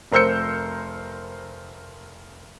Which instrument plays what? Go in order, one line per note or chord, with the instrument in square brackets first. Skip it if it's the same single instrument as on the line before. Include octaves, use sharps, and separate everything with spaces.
[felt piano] F1 A#4 C5 E6 G6 C#7